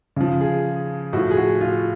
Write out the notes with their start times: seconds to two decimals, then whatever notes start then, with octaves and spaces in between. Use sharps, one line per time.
0.16 C#3 F3
0.41 G#4
1.13 A2 F3 F#4
1.31 G#4
1.37 F#4
1.61 F4